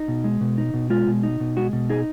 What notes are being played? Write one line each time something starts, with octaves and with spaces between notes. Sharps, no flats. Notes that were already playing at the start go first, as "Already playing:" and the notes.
Already playing: D#4
B2
G#3
B2
D#4
B2
G#3 F4
B2
D#4
B2
G#3 F#4
B2
D#4 G#4